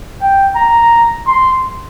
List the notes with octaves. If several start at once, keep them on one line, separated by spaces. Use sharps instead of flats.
G5
A#5
C6